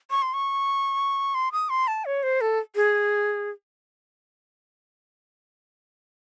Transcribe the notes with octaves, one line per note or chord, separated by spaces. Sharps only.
C#6
C6
C#6
C6
D#6
C6
A5
C#5
C5
A4
G#4